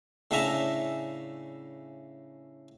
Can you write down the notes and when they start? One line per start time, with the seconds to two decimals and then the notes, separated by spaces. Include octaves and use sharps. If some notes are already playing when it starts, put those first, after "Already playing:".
0.31 A2 C#3 D4 E5 G#5 A#5